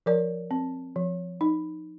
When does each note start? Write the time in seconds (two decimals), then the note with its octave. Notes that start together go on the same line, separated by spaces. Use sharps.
0.06 F3 A#4 D5
0.51 C4
0.96 F3
1.41 D#4